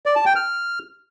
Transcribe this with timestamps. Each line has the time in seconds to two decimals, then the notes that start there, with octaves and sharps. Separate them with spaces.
0.06 D5
0.16 A5
0.26 G5
0.35 F6